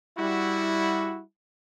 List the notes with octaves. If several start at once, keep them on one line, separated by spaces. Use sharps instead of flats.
G3 E4 F#4